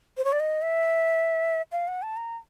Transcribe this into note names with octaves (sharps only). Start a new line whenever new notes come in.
C5
C#5
D5
D#5
E5
F5
F#5
A5
A#5